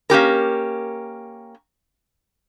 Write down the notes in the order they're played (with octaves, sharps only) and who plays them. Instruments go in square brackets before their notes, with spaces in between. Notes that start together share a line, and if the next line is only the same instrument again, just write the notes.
[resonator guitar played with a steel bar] A#3 C#4 G4 A#4